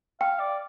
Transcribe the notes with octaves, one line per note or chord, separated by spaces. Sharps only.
F5 G5
D5